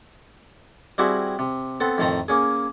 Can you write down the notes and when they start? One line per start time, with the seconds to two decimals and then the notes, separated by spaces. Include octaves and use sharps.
0.98 G3 C4 E4 F#4 G#4 E5
1.39 C3
1.80 B3 C4 A4
1.98 F2 A2 D#3 A4 C5 A#5
2.28 A#3 C#4 G#4